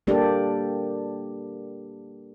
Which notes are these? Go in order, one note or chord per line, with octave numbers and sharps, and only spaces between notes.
G3 A#3 D4 G4 A4 D5